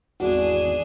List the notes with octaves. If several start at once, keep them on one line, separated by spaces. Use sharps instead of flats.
G#1 E2 D4 F#4 G#4